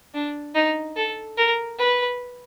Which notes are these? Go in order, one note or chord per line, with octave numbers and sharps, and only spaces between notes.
D4
D#4
A4
A#4
B4